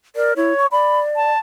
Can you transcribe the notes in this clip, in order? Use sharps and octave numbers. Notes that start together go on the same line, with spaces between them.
A#4 D5
E4 C#5
C#6
D5 B5
A5